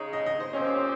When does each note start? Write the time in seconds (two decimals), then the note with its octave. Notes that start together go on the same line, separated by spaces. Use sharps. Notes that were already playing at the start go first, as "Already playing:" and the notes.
Already playing: C#3 G#3 D#4 C#5
0.13 D#5
0.26 D#5
0.40 C5
0.53 A#2 F3 C4 C#4 G4 C5